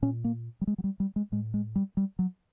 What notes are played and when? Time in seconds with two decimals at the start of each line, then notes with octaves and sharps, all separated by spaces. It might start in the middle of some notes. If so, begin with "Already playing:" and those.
0.02 A#2 C#4
0.24 A#3
0.61 G3
0.67 G#3
0.78 F#3
0.84 G3
1.00 G3
1.16 G#3
1.32 A2 G#3
1.54 G#3
1.76 G3
1.97 G3
2.19 F#3